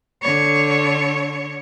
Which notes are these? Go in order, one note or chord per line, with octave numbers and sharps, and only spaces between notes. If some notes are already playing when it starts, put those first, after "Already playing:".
D3 C#5